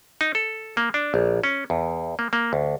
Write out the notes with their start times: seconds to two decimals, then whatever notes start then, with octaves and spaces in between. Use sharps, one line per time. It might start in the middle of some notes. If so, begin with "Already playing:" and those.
0.21 D#4
0.35 A4
0.77 A#3
0.94 D4
1.14 A#1
1.44 C#4
1.70 E2
2.19 A#3
2.33 A#3
2.53 D2